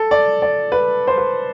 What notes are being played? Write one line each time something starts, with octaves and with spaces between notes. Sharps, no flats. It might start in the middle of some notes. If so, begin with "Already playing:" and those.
Already playing: A4
D5
D5
B4
C5
B4